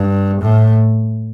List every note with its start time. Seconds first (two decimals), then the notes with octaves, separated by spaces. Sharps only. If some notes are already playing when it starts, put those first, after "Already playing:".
Already playing: G2
0.41 A2